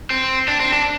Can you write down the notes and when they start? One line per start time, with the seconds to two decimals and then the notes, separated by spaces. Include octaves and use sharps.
0.10 C4
0.48 D4
0.60 C4
0.73 D4